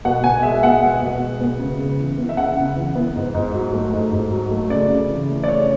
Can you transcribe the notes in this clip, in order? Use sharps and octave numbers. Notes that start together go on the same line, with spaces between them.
B2 F#5
B2 G#5
G#3 E5
B3 F#5
B2
B2
G#3
B3
C#3
C#3
E3
B3
E5
C#3 F#5
C#3
E3
B3
G#2
G#2
F#3
A3
G#2
G#2
F#3
A3
C#3 D5
C#3
E3
A3
D5
C#3 C#5